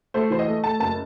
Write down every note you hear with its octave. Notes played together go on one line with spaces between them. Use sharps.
A3 C5
E3 C5
D#5
A3
A3 A5
F#1 A5